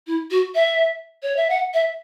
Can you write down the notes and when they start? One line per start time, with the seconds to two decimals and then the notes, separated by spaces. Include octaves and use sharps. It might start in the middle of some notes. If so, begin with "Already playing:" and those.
0.07 E4
0.30 F#4
0.55 E5
1.22 C#5
1.36 E5
1.49 F#5
1.73 E5